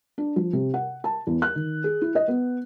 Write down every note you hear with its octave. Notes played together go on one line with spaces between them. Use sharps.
D4
F3
C3
F#5
A5
E2
F#6
D#3
G#4
E4
D#5
B3